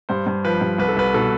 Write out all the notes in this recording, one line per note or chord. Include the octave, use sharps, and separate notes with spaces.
G2 C5
G2
F3 B4
G2
C2 B4
A4
C2 B4
B2 A4